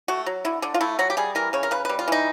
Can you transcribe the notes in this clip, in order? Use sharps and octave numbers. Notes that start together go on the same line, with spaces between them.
A3 F#4
F#3
D3 E4
D3 D4
F4
A3 E4
F#3 F#4
G4
G3 G#4
E3 A#4
C#3 C#5
A#4
C#3 B4
B4
G3
F4
E3 D#4